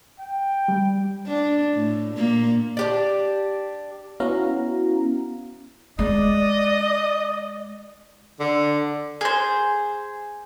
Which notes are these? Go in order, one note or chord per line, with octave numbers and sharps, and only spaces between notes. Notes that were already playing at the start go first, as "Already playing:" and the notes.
G5
G3
D4
A2
A#2 A#3
D4 G4 D5
B3 C#4 E4 F#4 F5 A#5
G#3 D5 D#5
D3
G#4 C5